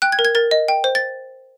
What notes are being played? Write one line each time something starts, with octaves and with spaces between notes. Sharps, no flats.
G5 F#6
G#6
A#4
G#6
A#4 A6
D#5
G5
C5
A6